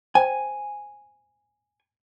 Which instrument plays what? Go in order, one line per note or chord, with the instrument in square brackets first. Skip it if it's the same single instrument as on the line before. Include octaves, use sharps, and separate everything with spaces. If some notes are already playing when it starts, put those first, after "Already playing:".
[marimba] C5 G5 [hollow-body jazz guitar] G#5